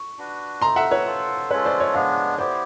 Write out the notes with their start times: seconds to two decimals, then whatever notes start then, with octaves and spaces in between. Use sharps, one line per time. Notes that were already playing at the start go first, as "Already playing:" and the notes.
Already playing: C#6
0.18 D4 F#4 B4
0.62 A3 C4 D#4 A#5 C6
0.76 E5 F#5
0.91 B4 C#5
1.06 F4 A4 C5
1.50 G#3 C#4 F4 A4 B4 C#5
1.65 C5 D5
1.80 C#5 D#5
1.94 G#3 B3 D4 D#5 F5
2.38 B3 E4 G4 C5 D5